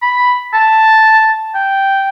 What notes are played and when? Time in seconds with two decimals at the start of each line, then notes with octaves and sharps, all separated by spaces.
0.02 B5
0.54 A5
1.55 G5